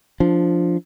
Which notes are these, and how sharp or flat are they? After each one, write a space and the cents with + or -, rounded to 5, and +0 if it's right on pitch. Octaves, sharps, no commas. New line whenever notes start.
F3 +0 D4 +0